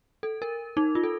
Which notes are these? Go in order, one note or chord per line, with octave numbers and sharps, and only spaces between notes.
A4
A#4
D#4
F4
A4